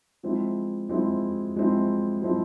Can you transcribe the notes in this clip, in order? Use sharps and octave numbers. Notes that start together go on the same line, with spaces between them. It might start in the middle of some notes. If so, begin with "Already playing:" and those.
F3 G#3 C4 E4
F3 G#3 C4 E4
F3 G#3 C4 E4
F3 G#3 C4 E4